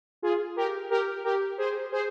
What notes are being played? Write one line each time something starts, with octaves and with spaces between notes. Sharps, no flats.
F4 G#4
G4 A#4
G4 A#4
G4 A#4
G#4 C5
G#4 C5